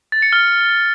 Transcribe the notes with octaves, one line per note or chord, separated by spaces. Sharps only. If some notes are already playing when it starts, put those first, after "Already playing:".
A6
C#7
F6